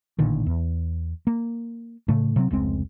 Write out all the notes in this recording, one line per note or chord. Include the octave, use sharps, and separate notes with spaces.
A1 A#2 D3 D#3
E2
A#3
A2 C#3 A3
C3 F#3 C4
F1 C#2 G#3 C4